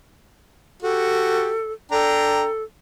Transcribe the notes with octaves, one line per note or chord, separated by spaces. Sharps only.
F#4 G4 A4
D4 A4 G5 A#5